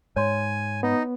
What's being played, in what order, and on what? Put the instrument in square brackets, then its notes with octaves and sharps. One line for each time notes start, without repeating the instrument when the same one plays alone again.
[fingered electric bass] G#2 [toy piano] C#5 C6 [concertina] G#5
[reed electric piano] B3 [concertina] D#4